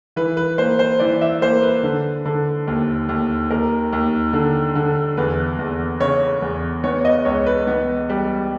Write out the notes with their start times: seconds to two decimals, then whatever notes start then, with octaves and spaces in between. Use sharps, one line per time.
0.16 E3 B4
0.37 B4
0.58 A#3 C5
0.79 C5
1.00 E3 D5
1.21 E5
1.42 A#3 C5
1.63 B4
1.83 D3
2.25 D3
2.67 D#2
3.09 D#2
3.50 D#2 A#4
3.93 D#2
4.33 D3
4.75 D3
5.17 E2 B4
5.59 E2
6.00 C#3 C#5
6.42 E2
6.84 B3 C#5
7.05 D#5
7.25 C#2 C#5
7.46 B4
7.67 B3
8.09 G3